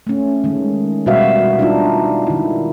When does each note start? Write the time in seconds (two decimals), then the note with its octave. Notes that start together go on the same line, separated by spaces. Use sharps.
0.07 A3 C#4
0.44 D#3 G#3
1.06 B2 G3 F#4 B4 E5 F5
1.59 D4 D#4 F4
2.27 D#3 E4